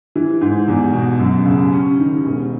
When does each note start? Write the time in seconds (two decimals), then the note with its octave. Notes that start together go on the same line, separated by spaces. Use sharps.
0.15 E3
0.41 G#2
0.68 E2
0.93 B2
1.19 F#2
1.46 C#3
1.72 C#4
1.99 D#3
2.25 E1